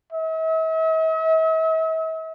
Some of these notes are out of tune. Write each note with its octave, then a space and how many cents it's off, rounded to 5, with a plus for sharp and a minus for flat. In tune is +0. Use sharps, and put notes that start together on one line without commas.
E5 -45